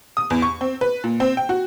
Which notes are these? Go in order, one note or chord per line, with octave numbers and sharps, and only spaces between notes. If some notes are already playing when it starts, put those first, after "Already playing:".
D#6
E2
C#6
C4
B4
A#2
C4
G5
F#4